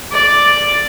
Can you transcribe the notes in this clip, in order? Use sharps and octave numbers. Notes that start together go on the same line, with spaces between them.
D5